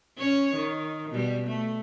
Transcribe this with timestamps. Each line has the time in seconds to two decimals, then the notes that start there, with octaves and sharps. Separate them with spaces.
0.17 C#4 C#5
0.55 D#3
1.11 B2 G3
1.48 A3